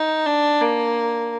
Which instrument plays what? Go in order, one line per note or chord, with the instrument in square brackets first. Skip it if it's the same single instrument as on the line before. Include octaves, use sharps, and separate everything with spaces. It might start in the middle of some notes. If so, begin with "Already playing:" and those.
Already playing: [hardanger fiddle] D#4
D4
A#3